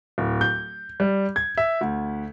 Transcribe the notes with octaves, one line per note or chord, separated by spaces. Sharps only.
D1
G6
G3
G#6
E5
D2